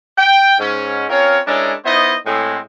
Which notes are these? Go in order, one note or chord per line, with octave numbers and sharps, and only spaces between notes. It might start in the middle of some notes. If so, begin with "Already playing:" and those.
G5
G#2 C#4
C4 C#4 F4 A#4 C#5
G#3 C#4 D4 E4 A4 A#4
B3 D#4 E4 C5 D#5
A2 G#3 C4